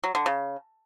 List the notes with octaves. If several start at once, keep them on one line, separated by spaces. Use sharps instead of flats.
F#3
D3
C#3